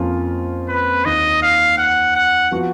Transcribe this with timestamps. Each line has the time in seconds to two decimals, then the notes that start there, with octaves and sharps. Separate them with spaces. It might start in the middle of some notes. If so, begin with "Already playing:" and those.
Already playing: F2 F3 A#3 C#4 F4
0.69 B4
1.05 D#2 D#3 A#3 D#4 D#5
1.42 F5
1.78 F#5
2.16 F#5
2.51 F3 B3 F#4